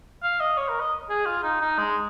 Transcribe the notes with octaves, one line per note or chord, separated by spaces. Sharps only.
F5
D#5
C#5
A#4
D#5
G#4
F4
D#4
D#4
G#3